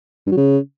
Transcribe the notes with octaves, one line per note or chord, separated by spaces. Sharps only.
G2
F#3
C#3